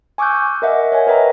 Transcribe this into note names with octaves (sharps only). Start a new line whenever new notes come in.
G#5 C#6 D6 E6 F#6 G6
A#4 D#5 E5 F#5
C#5 F#5 G#5
A#4 B4 D#5 E5 G5 A#5